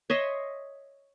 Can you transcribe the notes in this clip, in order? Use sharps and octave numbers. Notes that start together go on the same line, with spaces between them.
C#5 D#5 E5 C6